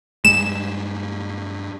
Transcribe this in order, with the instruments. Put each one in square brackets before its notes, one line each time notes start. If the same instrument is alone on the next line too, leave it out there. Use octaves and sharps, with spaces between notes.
[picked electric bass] G2 G3 G#3 [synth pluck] E7